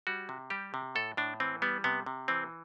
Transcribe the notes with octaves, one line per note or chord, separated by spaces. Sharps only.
G3 F#4
C3
G3 G4
C3
A2 A4
A2 D4
E3 C4
G3 B3
C3 B3
C3
E3 C4